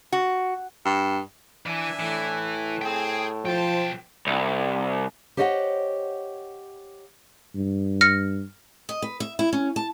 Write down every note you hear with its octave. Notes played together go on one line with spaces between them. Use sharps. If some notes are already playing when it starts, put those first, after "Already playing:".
F#4
G2
E3 D4 E5 G#5
A2 E3
G#4 G5 C6
B1 F3 C5 G5 A5
C2
G4 C5 C#5 D#5 E5 F#5
G2
F6 A#6 C#7
D#5
B4
E5
E4
C#4
A5